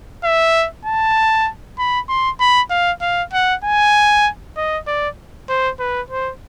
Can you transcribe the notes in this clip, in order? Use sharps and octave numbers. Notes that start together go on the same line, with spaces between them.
E5
A5
B5
C6
B5
F5
F5
F#5
G#5
D#5
D5
C5
B4
C5